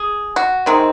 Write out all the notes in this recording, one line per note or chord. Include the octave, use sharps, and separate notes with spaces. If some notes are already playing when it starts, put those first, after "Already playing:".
Already playing: G#4
F#4
C3 D#3 G#3 C4